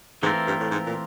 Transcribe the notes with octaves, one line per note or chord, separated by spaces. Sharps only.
G#2 E3 A3 C4 F4 A#4
G2
A2
G#2
A#2